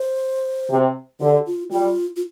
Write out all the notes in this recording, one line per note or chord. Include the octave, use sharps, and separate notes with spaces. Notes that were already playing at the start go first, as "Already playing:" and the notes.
Already playing: C5
C3
D3 G4
F4
G3 F4
F4